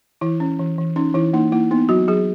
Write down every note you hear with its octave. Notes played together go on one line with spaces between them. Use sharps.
E3 E4
C#4
E3
E3
C#4 D#4
E3 E4
A#3 D#4
A#3 E4
B3 D#4
F#3 F#4
F#3 G#4